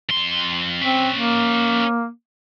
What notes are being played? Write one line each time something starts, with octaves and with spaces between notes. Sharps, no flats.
F2 C6
C4 C#4 E5
A#3